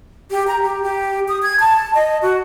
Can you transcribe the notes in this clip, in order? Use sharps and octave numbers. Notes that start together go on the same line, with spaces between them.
G4
A#5
G4
G4
D#6
G#6
A5
D#5
F#4